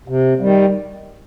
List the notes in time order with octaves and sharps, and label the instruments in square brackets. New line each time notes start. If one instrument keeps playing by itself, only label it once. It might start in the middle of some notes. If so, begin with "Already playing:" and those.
[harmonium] C3
D#3 G3